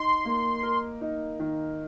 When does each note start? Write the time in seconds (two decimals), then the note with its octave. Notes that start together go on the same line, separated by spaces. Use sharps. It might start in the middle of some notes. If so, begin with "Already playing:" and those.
Already playing: D#4 C6
0.25 A#3
0.63 A#4
1.01 D#4
1.40 D#3